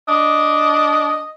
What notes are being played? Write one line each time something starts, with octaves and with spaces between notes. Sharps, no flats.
D4 D#5